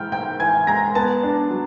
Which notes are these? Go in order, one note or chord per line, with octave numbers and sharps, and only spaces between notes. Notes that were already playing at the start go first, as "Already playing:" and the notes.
Already playing: G#2 E3 G#3 G5 F6 G6
G#2 G5 G6
E3 G#5 G#6
G#3 A#5 A#6
B3 A5 A6
D4
F#3